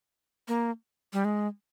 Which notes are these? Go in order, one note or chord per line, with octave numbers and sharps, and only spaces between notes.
A#3
G3
G#3